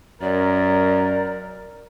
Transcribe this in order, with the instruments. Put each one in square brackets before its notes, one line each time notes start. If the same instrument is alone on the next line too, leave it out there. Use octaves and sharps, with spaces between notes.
[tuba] F#2 [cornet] A#4 [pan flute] D5